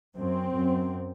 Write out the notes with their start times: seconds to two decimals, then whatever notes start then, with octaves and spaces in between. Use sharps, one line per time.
0.16 F#2 C4
0.55 F#2